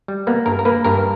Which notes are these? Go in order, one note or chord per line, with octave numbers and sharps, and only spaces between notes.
G3
A#3 B3
G2 A#4
A#4
A#3 B4
G2 A#4